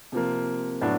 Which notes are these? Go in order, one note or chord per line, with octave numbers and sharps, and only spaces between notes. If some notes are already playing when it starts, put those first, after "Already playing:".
C3 F3 A#3
A2 F#3 B3 D4